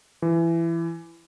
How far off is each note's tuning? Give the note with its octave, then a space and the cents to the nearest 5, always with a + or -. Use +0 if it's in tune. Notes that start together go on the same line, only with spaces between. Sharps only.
E3 +20